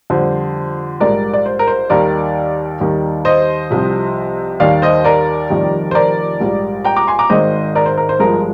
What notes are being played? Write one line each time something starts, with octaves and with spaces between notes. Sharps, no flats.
F2 D3 G3 C5
A#1 G#2 G3 A#4 D5
D5
C5
A#4
C5
D#2 D#3 G3 A#4 D5
D#2 D#3 G3
C5 D#5
C2 C3 F3
D#2 D#3 G3 D5 F5
C5 D#5
A#4 D5
F1 F2 D#3 G3
C5
A#4 D5
A#1 G#2 G3
G5 A#5
A#5 D6
G#5 C6
A#5 D6
G#1 G#2 D#3 G#3 C5 D#5
A#4 D5
C5
A#4
C5
G1 G2 F3 G#3 A#4